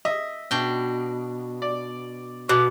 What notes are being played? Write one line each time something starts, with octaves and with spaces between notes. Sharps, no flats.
D#5 E5
B2 D4 G5
D5
B2 D6 F#6